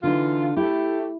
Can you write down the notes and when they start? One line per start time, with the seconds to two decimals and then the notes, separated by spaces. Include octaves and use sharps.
0.03 D3 E3 D#4 F4
0.57 A3 E4 G4